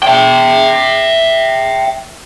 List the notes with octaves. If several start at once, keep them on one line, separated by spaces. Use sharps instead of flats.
E5 G5